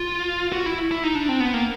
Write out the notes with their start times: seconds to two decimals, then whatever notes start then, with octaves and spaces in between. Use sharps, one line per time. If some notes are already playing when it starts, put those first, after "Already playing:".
Already playing: F4
0.52 F#4
0.66 E4
0.91 E4
1.04 D#4
1.15 D4
1.29 C4
1.40 B3
1.54 A#3